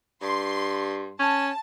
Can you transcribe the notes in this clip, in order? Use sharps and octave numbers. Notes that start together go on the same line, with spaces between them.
G2 C6
C#4 A5